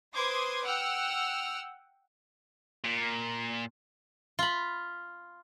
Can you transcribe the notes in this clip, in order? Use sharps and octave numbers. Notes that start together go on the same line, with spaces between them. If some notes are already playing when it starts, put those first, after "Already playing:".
B4 C5 C6 D6 D#6 G#6
F#5 G5 E6 F6
A#2
F4 B5